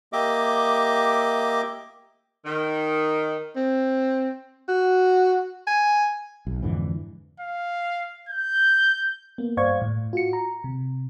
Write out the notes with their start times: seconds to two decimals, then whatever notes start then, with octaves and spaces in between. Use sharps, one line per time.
0.13 A#3 G4 D#5 E5 D6
2.45 D#3
3.56 C4
4.68 F#4
5.67 G#5
6.47 B1
6.63 F2 G#2 D3 E3
7.40 F5
8.29 G6
9.38 A#3 B3
9.57 G2 C5 D5 F5 C#6 G#6
9.82 A2
10.13 F4 F#4 C#7
10.33 A#5
10.64 C3